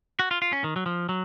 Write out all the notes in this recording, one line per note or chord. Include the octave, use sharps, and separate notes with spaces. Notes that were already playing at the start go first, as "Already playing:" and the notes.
F#4
F4
F4
C#4
D#3
F#3
F3
F#3